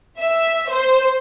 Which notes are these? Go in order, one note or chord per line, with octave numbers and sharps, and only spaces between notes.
E5
C5